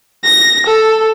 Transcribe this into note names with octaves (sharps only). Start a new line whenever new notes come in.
A#6
A4